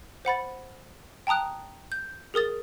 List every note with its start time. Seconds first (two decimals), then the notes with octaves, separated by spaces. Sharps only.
0.25 C5 F#5 B5 A6
1.27 G5 A5 A#5 D#6 F#6
1.92 G6
2.34 G#4 A#4 D#6 A6